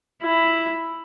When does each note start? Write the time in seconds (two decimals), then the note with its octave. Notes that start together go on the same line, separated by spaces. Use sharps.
0.23 E4